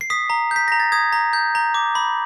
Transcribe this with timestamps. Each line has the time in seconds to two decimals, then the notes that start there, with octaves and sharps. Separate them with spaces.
0.01 C7
0.10 D#6 B6
0.30 A#5
0.51 G6 B6
0.68 A#5 A#6
0.80 A6
0.92 D#6 G#6
1.13 A#5
1.33 G6
1.55 A#5
1.74 D6
1.95 B5